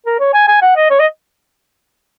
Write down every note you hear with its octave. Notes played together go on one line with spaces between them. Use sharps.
A#4
C#5
G#5
G#5
F#5
D#5
C#5
D#5